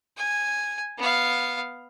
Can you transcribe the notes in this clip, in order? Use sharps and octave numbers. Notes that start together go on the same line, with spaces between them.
G#5
B3 F5